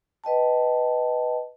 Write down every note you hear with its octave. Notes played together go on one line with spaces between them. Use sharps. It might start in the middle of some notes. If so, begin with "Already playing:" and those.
B4 D#5 G5 A5